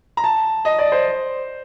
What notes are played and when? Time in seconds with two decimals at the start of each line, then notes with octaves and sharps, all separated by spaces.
0.17 A#5
0.24 A5
0.65 D#5
0.79 D5
0.92 C5